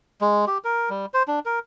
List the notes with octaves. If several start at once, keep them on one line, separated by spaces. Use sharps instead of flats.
G#3
G4
A#4
G3
C5
D4
A#4